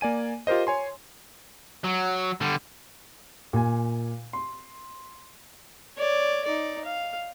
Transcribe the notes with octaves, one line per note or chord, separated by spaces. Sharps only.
A#3 D5 G#5 D#7
F4 G4 A#4 C5 D#5
C#5 G#5 C6
F#3
D3 G3
A#2 G#5
C6
C#5 D5
D#4 D5
F5